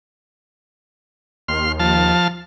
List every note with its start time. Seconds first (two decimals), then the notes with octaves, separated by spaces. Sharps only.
1.48 D#2 C6 F6
1.80 F3 A5 F6